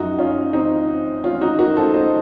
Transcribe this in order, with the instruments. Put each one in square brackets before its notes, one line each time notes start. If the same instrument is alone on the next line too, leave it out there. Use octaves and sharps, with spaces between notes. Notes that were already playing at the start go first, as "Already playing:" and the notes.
Already playing: [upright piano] F#2 F3 D#4 F#4
C#4 F4
C4 D#4
C#4 F4
D#4 F#4
F#4 A#4
A4 C5
C5 D#5